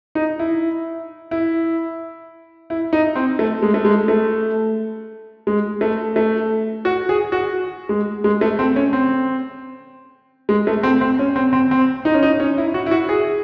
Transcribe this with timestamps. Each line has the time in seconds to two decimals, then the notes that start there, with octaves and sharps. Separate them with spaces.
0.15 D#4
0.39 E4
1.31 E4
2.70 E4
2.93 D#4
3.16 C4
3.39 A3
3.62 G#3
3.74 A3
3.85 G#3
4.08 A3
5.47 G#3
5.81 A3
6.16 A3
6.85 F#4
7.09 G#4
7.32 F#4
7.89 G#3
8.24 G#3
8.41 A3
8.59 C4
8.76 C#4
8.93 C4
10.49 G#3
10.67 A3
10.83 C4
11.01 C4
11.19 C#4
11.36 C4
11.53 C4
11.71 C4
12.05 D#4
12.14 C#4
12.23 D#4
12.40 C#4
12.58 E4
12.74 F#4
12.86 E4
12.91 F#4
13.09 G#4